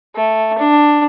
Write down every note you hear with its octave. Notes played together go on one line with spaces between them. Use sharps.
A3
D4